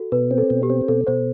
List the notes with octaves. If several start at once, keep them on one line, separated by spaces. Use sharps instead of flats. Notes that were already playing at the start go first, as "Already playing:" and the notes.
Already playing: F#4 A4
B2 B4
C4
A4
B2
G4
C4
B2 A4
B2 C5